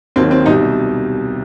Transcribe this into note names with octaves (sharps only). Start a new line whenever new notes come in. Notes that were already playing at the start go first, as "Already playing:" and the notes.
D#2 D#3 F#3 C4
C4
C2 B2 G3 D#4